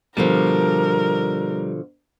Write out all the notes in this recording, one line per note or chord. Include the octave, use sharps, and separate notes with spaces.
B2 D3 F3 G3 A#4